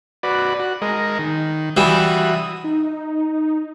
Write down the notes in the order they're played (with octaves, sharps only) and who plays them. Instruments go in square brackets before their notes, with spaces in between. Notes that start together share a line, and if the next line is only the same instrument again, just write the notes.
[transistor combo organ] F#4 B4 D5
F#4
G#3 A#4 D#5
D#3
[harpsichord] E3 G3 [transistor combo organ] F#4 E5 D#6
[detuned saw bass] D#4